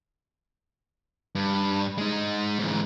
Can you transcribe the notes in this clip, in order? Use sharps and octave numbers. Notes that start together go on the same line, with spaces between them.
G2
G#3 D#4
G#2 E3